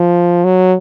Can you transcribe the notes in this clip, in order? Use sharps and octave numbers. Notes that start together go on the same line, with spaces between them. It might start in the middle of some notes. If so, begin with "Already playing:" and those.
Already playing: F3
F#3